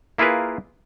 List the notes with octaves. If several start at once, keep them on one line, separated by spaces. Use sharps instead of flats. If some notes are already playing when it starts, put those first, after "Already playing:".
A#3 E4 F4 G#4 A#4 B4